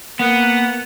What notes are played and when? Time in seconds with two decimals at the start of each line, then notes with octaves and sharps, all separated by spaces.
0.19 A#3 B3 F#5